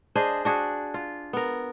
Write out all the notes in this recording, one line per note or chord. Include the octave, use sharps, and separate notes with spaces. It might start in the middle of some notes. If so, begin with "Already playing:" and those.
D4 G#4 C5 D#5
D4 F#4 G#4
F4
B3 A#4